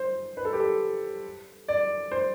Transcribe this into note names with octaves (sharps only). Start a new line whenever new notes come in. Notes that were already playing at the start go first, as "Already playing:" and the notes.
Already playing: C5
B4
A4
G4
A4
D5
C5